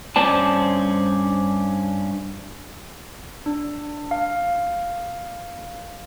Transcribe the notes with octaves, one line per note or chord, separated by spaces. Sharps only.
G2 C#4 C5 D5 A5
D4
F5